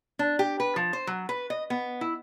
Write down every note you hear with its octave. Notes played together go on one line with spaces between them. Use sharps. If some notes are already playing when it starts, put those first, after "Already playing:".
D4
G4
B4
F3
C5
F#3
B4
D#5
B3
E4